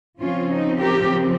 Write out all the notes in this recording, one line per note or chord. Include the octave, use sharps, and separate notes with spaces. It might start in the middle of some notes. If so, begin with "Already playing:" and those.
C#3 F3 C4 C#4 F4
D#4
G4 A#4